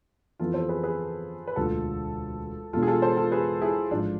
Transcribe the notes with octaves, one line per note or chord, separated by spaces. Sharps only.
F2 E3 B3 F4 A4
A4 C5
G#4 B4
G#4 B4
B4
E1 D2 D3 F4 A4
E1 E2 B2 A3 D4 F4 A4
G#4
F4 A4
A4 C5
F4 A4
G#4 B4
E4 G#4
A1 G#2 F3 D4 F4